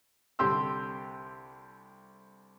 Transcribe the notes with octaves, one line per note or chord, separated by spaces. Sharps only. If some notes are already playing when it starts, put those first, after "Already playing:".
C2 D3 C4 G4 C6 E6